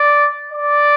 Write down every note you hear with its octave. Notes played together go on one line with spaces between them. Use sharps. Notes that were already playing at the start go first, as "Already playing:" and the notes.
Already playing: D5
D5